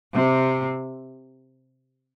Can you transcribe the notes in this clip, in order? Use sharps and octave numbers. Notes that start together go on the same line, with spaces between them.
C3